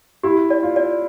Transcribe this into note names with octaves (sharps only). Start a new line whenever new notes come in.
E4 G4
D5
F4
D5